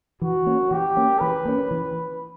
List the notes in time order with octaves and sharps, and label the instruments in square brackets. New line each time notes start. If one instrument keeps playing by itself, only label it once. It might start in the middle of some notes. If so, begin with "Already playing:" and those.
[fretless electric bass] E3 [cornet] F#4
[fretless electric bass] A#3 C#4
[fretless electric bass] E3 [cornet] G4
[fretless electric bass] A#3 C#4
[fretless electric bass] E3 [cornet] B4
[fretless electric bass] A#3 C#4
E3